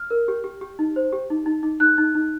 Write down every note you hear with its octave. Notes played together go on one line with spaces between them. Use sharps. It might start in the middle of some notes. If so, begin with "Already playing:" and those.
Already playing: F6
A#4
G4
G4
G4
D#4
C5
G4
D#4
D#4
D#4
D#4 F#6
D#4
D#4